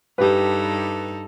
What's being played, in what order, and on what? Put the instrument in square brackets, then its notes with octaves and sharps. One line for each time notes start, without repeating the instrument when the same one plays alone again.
[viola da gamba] G2 D#4 A4 [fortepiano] G4 B4